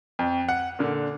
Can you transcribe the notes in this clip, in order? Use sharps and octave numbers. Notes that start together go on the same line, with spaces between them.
F2
F#5
A#2 D3